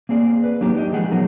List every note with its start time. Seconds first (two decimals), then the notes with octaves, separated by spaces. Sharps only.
0.09 A#3 C4 G#4 D5
0.44 B4
0.61 F#3 A#3 D4 D#4 G4
0.75 D#4 G4 D#5
0.93 F3 G#3 G#4 F#5
1.12 F#3 A3 B3 D#4 A#4